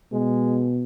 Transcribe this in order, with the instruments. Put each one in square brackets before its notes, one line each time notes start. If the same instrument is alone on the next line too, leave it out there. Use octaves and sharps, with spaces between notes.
[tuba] B2 [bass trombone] G#3